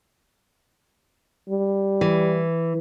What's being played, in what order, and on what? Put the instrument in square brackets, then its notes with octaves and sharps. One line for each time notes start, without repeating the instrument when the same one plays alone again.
[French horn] G3
[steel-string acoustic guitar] E3